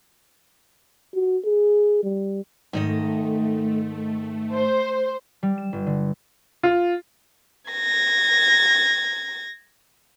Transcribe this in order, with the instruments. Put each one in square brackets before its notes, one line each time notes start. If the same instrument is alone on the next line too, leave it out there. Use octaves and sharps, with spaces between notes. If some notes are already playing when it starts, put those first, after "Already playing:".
[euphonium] F#4
G#4
G3
[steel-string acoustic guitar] G#2 D#3 D#5 [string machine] A3
[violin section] C5
[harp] G3
E7
G1
D3
[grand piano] F4
[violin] G#6 A#6